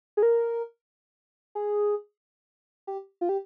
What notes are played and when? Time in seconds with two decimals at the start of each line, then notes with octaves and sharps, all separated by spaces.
0.17 G#4
0.23 A#4
1.55 G#4
2.87 G4
3.21 F4
3.29 G4